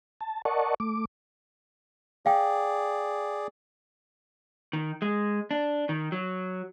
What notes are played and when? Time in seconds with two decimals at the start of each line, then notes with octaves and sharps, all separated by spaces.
0.21 A5
0.45 A#4 D5 D#5 F#5 A5 C#6
0.80 A3 D6
2.26 G#4 D5 F5 G5
4.73 D#3
5.02 G#3
5.51 D4
5.89 D#3
6.12 F#3